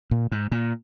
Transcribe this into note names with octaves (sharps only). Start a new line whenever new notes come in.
A#2
G#2
A#2